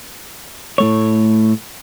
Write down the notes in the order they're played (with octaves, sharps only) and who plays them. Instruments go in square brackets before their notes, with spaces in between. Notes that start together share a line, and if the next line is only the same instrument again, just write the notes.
[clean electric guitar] A2 A3 C#5